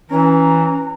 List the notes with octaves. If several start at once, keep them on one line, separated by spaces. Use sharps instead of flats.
E3 C#4 A#5